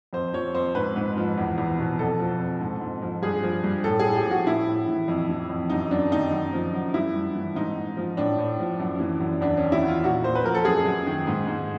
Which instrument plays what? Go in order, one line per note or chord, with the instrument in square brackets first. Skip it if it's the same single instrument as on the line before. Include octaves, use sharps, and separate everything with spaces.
[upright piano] F2 C5
F3 C#5
F2 C5
G#2 B4
G#2
F3
E2
E2
B2
F2 A4
F3
F2
G#2
G#2
F3
G2 G#4
F3
G2
A2 A4
G#4
A2
G4
F3 F#4
A2 E4
A2
E3
F2
E3
F2
F#2 D#4
F#2 D4
D#3 D#4
F#2
F3
F#2
G2 E4
G2
E3
G#2 D#4
G#2
F3
A2 D4
A2
F3
F#2
E3
F#2
E2 D4
C#4
D#3
E4
E2
F4
A#2 F#4
A#2 C5
B4
F3 A#4
A4
F#2 G#4
F#2
D#3
G#2
G#2